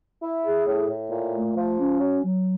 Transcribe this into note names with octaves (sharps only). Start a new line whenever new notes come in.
E4
G#4
A2
A2
A#2
A3
F3
C#4
F#3
F#3